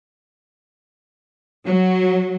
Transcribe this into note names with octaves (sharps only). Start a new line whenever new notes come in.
F#3